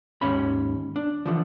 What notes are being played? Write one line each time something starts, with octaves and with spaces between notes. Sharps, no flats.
D#2 G#2 C#4 B5
D4
D3 E3 F3